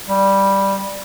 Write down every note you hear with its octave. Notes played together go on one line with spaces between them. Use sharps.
G3